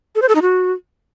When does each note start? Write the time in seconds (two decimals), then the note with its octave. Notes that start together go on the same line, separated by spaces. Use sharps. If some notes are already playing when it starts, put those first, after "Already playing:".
0.15 A4
0.22 C5
0.29 A4
0.35 D#4
0.42 F#4